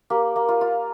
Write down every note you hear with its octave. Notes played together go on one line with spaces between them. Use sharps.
A#3 G4
A#3
F4
F4